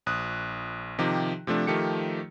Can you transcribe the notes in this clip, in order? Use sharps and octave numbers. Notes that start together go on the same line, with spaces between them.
A#1 D#6 F#6
C3 D#3 F3 D#4 G4
C3 F3 A3 D4
D#3 F3 A3 G4 C#7